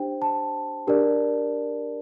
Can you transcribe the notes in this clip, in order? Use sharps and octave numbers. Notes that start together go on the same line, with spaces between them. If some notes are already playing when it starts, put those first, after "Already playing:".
Already playing: D4 G4 C5 G5
A5
D4 G4 A#4 D5